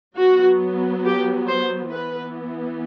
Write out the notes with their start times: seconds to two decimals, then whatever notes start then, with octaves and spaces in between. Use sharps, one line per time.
0.16 F#3 B3 F#4
1.04 G4
1.47 C5
1.91 E3 B3 B4